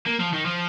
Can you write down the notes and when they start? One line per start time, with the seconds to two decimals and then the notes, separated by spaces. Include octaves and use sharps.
0.06 A#3
0.20 F3
0.33 D#3
0.45 F3